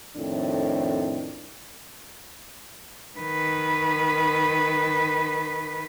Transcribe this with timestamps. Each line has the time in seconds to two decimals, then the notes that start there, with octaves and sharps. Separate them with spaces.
0.17 F2 A2 D#3 C4 D4
3.19 D#3 B4